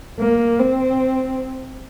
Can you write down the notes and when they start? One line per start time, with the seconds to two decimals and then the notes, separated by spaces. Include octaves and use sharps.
0.20 A#3
0.60 C4